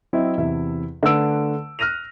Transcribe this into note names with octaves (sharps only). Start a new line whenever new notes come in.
F#3 C4 E4 D#5
E2 C3 E4 E5
D3 A3 D4 B4 E6 D7
F6 F#6 A#6 D#7 F7